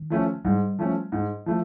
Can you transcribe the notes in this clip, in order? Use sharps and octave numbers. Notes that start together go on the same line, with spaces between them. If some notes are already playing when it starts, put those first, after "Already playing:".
Already playing: D#3
F3 A3 C#4
G#2 G3
F3 A3 C#4
G#2
F3 A3